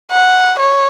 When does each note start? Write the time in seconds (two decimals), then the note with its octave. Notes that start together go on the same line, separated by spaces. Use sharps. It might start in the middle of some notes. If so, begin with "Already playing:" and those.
0.11 F#5
0.60 C#5